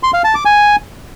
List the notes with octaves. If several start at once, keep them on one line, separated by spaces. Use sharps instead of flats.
C6
F5
A5
D6
G#5